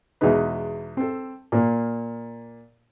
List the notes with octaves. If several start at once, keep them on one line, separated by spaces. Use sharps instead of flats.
E2 B2 G#3 D#4 B4
C4 A4
A#2 A#3